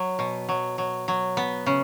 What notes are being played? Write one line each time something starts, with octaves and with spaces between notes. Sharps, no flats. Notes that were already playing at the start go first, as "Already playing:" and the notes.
Already playing: F#3
B2
F#3
F#3
F#3
B3
C#3